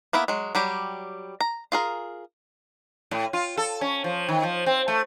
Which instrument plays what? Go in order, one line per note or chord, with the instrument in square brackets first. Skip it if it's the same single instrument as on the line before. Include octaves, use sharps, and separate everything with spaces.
[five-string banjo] A#3 B3 E4 E5
F#3 G#3
F#3 G3 G4
A#5
F4 G#4 A#4
[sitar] A2
F4
A4
C#4
F3
D#3
F3
C4
A3